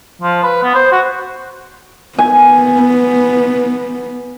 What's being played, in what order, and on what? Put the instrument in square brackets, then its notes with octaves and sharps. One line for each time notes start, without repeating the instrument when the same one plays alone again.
[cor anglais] F3
B4
B3
C5
F#4
[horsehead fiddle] B3 [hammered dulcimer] G#5